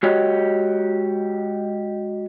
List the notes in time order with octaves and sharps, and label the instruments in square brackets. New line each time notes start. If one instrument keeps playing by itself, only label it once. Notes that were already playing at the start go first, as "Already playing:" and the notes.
[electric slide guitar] G#3 F#4 G4 C#5 D#5